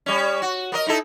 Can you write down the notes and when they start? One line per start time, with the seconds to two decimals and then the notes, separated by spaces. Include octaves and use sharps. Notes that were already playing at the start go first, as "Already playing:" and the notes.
0.06 G3 C#4
0.42 F#4
0.72 B3 A#4 D#5
0.87 D#4 E4 A4